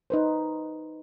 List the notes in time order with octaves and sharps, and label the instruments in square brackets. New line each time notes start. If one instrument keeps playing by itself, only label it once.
[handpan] D#4 B4 C5